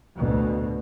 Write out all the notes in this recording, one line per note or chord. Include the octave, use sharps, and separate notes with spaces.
D2 B2